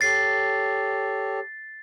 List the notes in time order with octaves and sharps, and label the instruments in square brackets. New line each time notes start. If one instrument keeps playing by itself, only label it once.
[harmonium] G4 A4 C#5 [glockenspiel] A6 C7